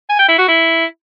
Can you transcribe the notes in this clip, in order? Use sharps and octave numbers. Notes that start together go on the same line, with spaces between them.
G#5
G5
E4
F#4
E4